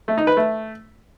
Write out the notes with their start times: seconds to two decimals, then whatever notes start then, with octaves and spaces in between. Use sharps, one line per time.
0.08 A3
0.18 D#4
0.27 B4
0.37 A3